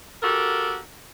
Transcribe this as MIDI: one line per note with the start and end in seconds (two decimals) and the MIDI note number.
0.22 0.78 66
0.22 0.78 67
0.22 0.78 69
0.22 0.78 70